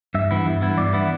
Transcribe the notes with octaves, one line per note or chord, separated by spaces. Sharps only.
G2 E5
E3 B3 E4
G2
E3 B3 E4
G2 D5
E3 B3 E4